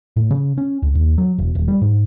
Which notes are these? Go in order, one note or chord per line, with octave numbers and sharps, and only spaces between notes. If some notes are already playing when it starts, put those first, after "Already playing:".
A2
C#3
C#4
C#2
D#2
F#3
E1
D#1
G3
G#2